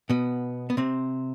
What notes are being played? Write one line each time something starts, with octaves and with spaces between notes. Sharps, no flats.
B2 B3
B3
C3 C4